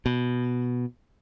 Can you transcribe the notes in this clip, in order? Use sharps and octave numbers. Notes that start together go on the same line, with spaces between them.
B2